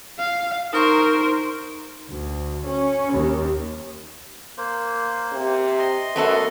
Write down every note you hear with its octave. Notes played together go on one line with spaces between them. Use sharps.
F5
D#4 A#4 C5 C#6
D2
C#4
D#2
A#3 C5
C3
D#5 C6
F#2 A3 B3 A4